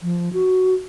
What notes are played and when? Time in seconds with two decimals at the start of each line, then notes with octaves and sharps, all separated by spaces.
0.01 F3
0.33 F#4